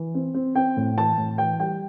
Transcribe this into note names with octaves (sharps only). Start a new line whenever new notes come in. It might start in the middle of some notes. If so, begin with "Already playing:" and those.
Already playing: E3
C4
C4
C4 G5
A2
E3 A5
A2
E3 G5
G3 G5